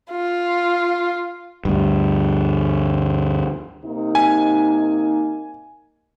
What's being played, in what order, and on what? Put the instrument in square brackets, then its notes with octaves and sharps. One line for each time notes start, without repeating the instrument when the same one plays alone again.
[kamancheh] F4
[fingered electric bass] D2 G2
[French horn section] C3 A#3 D#4
[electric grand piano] G#5